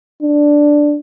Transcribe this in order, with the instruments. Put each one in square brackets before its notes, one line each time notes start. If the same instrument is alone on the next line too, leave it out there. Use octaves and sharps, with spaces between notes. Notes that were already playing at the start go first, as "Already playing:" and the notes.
[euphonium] D4